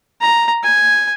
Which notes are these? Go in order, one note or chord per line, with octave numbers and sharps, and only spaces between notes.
A#5
G#5